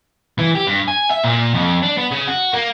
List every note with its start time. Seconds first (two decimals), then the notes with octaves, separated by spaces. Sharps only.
0.39 E3
0.55 G4
0.67 G2
0.88 G#5
1.10 E5
1.24 A#2
1.55 F2
1.83 D4
1.98 B3
2.12 C#3
2.28 F#4
2.54 A#3